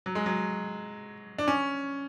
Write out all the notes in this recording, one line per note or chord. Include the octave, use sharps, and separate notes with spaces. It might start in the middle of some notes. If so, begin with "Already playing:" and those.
F#3
G#3
F#3
D4
C#4